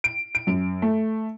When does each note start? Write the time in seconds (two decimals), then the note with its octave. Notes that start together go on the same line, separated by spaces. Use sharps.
0.04 D7
0.35 D7
0.47 F#2
0.82 A3